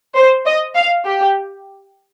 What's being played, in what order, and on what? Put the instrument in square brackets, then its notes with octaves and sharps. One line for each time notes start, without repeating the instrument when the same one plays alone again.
[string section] C5
D#5
F5
G4